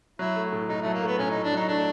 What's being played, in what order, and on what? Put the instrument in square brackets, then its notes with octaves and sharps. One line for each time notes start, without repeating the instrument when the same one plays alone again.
[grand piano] F#3 [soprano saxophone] E4
[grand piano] A3
A2
[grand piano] A2 [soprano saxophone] D#4
[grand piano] F#3 [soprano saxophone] A3
[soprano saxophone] A#3
[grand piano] A3 [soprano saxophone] B3
[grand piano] A2 [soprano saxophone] C#4
[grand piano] A2 [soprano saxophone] D#4
[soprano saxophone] D4
[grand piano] F#3 [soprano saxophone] D#4
[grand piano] A3 [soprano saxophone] D4